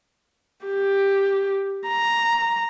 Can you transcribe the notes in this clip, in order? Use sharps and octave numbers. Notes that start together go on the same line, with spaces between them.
G4
A#5